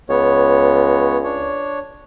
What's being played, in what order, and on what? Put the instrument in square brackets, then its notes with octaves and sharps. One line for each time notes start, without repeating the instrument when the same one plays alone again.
[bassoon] C#2 [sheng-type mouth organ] B3 C#5
[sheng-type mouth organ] D4 C#5